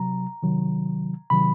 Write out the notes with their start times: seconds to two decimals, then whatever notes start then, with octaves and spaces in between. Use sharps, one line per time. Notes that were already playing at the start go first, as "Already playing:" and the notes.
Already playing: C3 F#3 A#5
0.43 C3 D#3 F#3
1.30 C3 D#3 F#3 B5